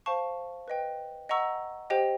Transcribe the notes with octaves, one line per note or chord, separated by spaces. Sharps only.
C5 F5 A5 C#6
B4 D#5 G5
D#5 F#5 A#5 C#6 E6
G4 C5 D#5 G5